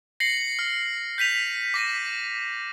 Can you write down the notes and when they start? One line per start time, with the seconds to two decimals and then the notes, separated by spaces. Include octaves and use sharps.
0.20 A#6 C7 C#7 F#7
0.59 F6
1.18 G6 B6 D#7 F7
1.74 D6 A#6 B6 D#7